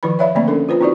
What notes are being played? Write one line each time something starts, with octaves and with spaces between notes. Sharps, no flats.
D#3 F3 E4 B4 B5
C#5 D5 E5 F5 B5
D3 A3 A#3 C4 D5 B5
C#4 D4 A4 A#4
F4 B4 C5
C4 D#4 E4 F#4 D5